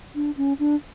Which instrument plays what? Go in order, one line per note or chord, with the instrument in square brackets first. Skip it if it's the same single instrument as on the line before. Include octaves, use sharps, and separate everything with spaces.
[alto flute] D4
C#4
D4